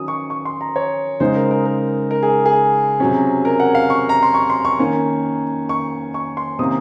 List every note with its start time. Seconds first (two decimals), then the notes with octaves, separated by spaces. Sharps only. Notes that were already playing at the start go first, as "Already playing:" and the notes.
Already playing: D#3 F#3 C#4 D#6
0.08 C#6
0.30 C#6
0.45 C6
0.61 A#5
0.76 C#5
1.20 C#3 G#3 D#4 C5
1.35 A#4
1.51 A#4
1.65 A#4
2.11 A#4
2.23 G#4
2.46 G#4
3.00 C3 F#3 C#4
3.45 A#4
3.60 F#5
3.75 F5
3.90 C#6
4.09 A#5
4.23 C6
4.34 C#6
4.50 C6
4.65 C#6
4.79 D#3 A#3 C#4
5.69 C#6
6.14 C#6
6.37 C6
6.59 C3 D#3 A#3 C#4 D#6